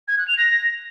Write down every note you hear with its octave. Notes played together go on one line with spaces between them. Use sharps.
G#6
F#6
F7
A#6